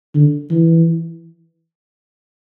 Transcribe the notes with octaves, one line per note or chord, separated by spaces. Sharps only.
D3
E3